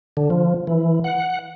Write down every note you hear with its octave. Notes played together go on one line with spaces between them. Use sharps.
D3
F3
E3
F#5